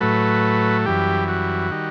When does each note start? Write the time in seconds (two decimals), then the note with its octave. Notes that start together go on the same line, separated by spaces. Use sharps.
0.01 A2 F#3 A3 B4
0.86 F#2 E3 G3 G4
1.28 F#4
1.71 D#3 G3